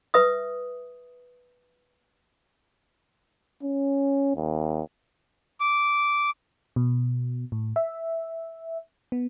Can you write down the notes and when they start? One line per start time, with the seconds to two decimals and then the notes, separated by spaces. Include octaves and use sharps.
0.14 B4 E5 D#6
3.63 C#4
4.36 D#2
5.60 D6
6.76 B2
7.52 A2
7.76 E5
9.12 B3